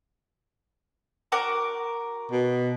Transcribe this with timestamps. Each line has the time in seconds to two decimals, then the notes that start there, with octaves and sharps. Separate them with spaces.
1.32 F#4 A#4 D6
2.31 B2